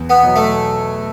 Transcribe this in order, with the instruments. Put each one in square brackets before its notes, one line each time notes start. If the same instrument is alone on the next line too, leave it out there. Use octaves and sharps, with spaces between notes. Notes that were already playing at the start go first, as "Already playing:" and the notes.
Already playing: [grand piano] E2
[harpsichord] B3
[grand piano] B2 F#3
[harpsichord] A3